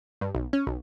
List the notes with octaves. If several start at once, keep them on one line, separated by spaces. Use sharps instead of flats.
G2
B1
C#4
B1